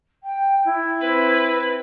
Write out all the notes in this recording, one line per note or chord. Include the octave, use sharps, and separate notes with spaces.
G5
E4
C4 B4